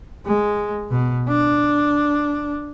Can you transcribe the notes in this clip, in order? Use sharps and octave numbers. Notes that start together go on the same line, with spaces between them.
G#3
B2
D4